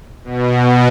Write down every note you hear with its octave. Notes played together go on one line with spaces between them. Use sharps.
B2